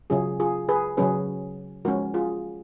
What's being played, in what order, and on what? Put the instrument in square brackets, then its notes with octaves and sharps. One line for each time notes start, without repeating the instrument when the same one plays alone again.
[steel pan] C#3 F#3 C#4 F4 G#4
F4 G#4
G#4 B4
C#3 F#3 C#4 G#4 B4
F3 G#3 C#4 F#4 A#4
F4 G#4